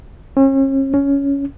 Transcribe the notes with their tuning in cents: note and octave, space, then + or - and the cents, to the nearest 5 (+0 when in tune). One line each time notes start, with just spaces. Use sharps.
C#4 -40
C#4 +10